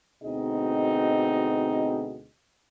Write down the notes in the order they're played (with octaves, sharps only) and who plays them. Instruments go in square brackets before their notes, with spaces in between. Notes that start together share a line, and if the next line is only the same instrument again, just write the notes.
[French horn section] D2 B2 C4 D#4 G#4 D#5